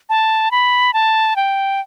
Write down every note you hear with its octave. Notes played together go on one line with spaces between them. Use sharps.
A5
B5
A5
G5